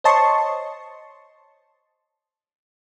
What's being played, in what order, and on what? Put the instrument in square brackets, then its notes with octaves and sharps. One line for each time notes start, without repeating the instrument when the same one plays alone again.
[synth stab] C5 C#5 D#5 A5 C6 C#6